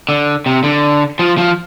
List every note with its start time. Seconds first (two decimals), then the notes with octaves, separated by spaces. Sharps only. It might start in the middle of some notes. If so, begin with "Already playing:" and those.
0.09 D3
0.46 C3
0.64 D3
1.19 F3
1.38 F3